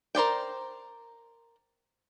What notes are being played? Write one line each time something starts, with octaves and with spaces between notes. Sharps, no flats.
A#4 C5 D5 G5